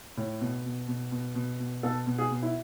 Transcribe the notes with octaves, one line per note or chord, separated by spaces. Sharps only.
A2
B2
B2
B2
B2
B2
B2
B2 A4
B2
G#4
B2
E4